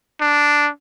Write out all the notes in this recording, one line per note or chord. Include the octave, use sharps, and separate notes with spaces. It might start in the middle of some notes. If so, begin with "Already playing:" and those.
D4